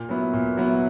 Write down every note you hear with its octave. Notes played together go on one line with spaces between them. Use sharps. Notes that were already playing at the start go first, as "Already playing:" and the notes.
Already playing: A#2
F#3 B3 E4
A#2
F#3 B3 E4